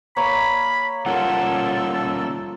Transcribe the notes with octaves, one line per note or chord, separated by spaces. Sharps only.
A#3 C#5 D5 B5
F3 G3 A#3 C#4 F4 A4 F#5